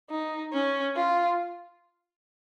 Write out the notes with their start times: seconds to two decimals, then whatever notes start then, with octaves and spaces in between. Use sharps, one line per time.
0.11 D#4
0.53 C#4
0.96 F4